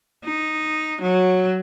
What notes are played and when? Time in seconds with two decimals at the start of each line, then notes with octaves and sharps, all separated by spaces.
0.24 D#4
1.02 F#3